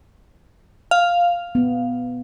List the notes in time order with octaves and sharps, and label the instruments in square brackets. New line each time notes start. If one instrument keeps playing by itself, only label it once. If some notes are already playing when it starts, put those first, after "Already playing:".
[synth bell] F5
[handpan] B3